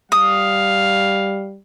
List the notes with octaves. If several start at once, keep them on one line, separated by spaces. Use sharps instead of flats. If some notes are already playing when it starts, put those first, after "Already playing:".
G3 F5 D#6